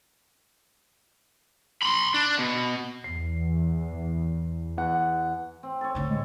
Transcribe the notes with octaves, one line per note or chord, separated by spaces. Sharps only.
B5 C6
D4
B2
E2 C7
E2 F#5
C4
A4 C#5
A2 D3 A4
G#3